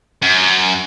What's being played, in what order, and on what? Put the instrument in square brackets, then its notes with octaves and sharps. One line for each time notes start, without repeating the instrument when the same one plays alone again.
[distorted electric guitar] F#2